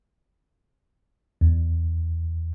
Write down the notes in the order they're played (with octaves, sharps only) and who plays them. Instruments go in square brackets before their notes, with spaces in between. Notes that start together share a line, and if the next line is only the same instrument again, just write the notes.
[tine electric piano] E2